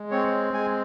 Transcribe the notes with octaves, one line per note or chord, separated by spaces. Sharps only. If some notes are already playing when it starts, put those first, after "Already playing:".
Already playing: G#3
C4 C#5
G#3 G#5